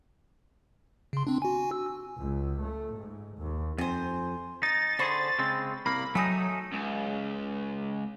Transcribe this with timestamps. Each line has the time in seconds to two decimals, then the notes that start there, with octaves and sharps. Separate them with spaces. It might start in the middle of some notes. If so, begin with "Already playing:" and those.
1.13 C#3 C6
1.27 C4 D4
1.42 F#4 G#5
1.71 E6
2.20 C#2
2.65 A3
2.97 G#2
3.39 D#2
3.78 F2 C5 G#5
4.63 D#4 A6
4.99 D3 G#4 C5 B5 C#6
5.39 C#3 G#3 C4
5.86 C2 A#3 B5
6.15 F#3 A3 D#4 G#5 D#6
6.73 C#2